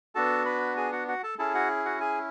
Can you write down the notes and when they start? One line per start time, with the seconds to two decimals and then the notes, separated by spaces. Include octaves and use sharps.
0.15 B3 D4 F#4 A4 A5
0.46 B4 B5
0.77 G#4 G#5
0.92 F#4 F#5
1.08 F#4 F#5
1.23 A4 A5
1.39 C#4 E4 G#4 A4 A5
1.54 F#4 F#5
1.85 F#4 F#5
2.00 G#4 G#5